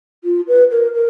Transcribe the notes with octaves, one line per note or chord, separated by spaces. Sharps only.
F4
B4
A#4
A#4